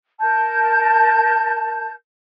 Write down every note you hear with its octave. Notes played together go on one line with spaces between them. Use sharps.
A#4 A5 G6